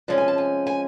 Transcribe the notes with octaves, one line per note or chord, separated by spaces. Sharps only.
C3 F3 G#3 C#4 D5
G#5
A5
G#5
G#5